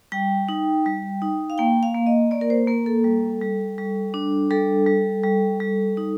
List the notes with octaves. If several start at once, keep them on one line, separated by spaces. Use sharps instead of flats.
G3 G5
D#4
G3
D#4
F5
A#3 G5
F5
A#3
D#5
A#3 D5
A#4
C5
A#3 A#4
A4
G3
G3
G3
D4
G3 A4
G3
G3
G3
D#4